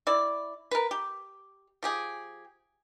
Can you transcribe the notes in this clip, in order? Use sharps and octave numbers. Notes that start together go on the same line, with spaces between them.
E4 D5
A#4 B4
G4
F3 G4 G#4